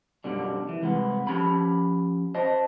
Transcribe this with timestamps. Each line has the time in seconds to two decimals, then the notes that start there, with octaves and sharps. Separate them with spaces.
0.24 F#2 B2 D3 G3
0.69 E3
0.81 C2 G#3 B3
1.27 F3 C#4 G4 B5
2.35 C5 D#5 A5